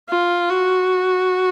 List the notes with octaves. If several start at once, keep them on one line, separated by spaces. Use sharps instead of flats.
F4
F#4